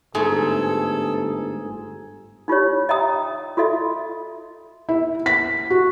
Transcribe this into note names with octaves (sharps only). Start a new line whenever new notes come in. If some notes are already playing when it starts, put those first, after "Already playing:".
G1 G#2 A3 G#4 A4
D#4 F4 G4 C#5
D#5 E5 G5 A#5 D#6
F4 F#4 A4 D#5 E5
E4
B6
F#4